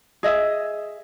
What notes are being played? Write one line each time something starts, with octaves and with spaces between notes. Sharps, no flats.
G#4 D#5 E5